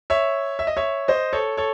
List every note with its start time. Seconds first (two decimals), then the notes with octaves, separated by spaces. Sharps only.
0.10 C#5 E5
0.59 E5
0.67 D#5
0.77 C#5 E5
1.08 C5 D#5
1.33 A4 C#5
1.57 A4 C#5